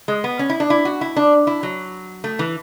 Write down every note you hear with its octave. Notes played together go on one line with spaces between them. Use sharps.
G#3
B3
C#4
E4
D4
E4
F#4
E4
D4
E4
F#3
A3
E3